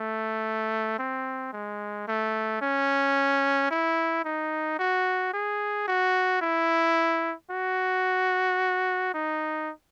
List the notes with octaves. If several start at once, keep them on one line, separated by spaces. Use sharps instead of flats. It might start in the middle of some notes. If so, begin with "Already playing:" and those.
Already playing: A3
C4
G#3
A3
C#4
E4
D#4
F#4
G#4
F#4
E4
F#4
D#4